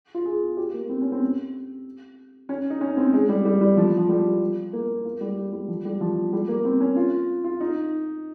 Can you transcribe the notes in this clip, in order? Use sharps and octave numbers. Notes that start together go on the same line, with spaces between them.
F4
G#4
G4
A#3
C4
C#4
C4
C#4
D#4
C#4
C4
G#3
G3
G3
G3
F3
F3
G3
A#3
A#3
G3
G3
F3
G3
F3
G3
A#3
C4
C#4
F4
F4
D#4